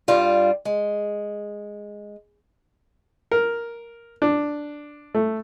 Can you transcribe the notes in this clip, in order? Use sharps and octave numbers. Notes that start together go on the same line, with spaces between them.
G2 G3 F4
G#3
A#4
D4
A3